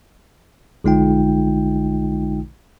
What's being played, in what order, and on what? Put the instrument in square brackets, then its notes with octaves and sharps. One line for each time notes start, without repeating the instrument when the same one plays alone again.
[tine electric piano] A#1 D3 G#3 D#4 F4 G5